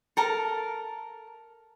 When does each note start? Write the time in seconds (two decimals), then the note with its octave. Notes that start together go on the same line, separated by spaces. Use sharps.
0.17 A4 A#4 A5